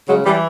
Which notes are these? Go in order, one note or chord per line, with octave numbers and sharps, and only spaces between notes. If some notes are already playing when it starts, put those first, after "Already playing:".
C#3 F#3 G#3
E3 G3